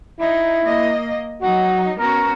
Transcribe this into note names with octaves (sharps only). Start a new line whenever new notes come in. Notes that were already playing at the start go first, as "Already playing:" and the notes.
D#4 E4
A#3 D#5
F#3 D#4 F#4
B3 C#4 F#4 A#4